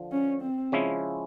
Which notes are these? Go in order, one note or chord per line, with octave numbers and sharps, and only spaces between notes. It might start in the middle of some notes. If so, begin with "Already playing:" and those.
Already playing: D3 F3
C#4
C4
C#3 F3 G#3 C#4 E4